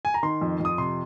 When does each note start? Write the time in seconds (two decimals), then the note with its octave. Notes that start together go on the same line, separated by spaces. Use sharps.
0.05 G#5
0.14 A#5
0.23 D#3 C6
0.41 F2
0.60 F2 D#6
0.78 C3 C6